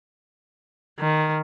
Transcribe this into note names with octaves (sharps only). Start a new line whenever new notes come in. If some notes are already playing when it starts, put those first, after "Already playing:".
D#3